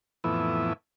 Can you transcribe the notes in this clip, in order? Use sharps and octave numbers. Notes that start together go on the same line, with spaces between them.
F2 A2 E3 B3 E4